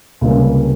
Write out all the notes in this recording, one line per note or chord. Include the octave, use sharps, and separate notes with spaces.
C#2 C3 G3 A#3 C#4